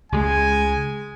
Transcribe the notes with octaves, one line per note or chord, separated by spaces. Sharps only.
C#2 G#3 G#5